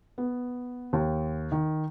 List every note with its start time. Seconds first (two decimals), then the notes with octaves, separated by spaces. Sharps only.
0.18 B3
0.93 D#2
1.52 D#3